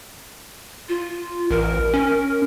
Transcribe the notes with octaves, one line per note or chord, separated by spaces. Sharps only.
F4
A1 A#4
C#4